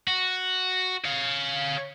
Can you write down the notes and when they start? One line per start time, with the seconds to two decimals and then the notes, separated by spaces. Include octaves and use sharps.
0.08 F#4
1.04 C#5 F5